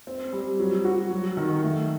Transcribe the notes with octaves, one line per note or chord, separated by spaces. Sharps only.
C4
G3
F#3
F#4
F#3
D#3
A3